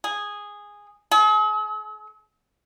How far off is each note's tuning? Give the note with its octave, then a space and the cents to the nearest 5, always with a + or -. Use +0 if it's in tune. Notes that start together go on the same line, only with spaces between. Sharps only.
G#4 -10
G#4 +45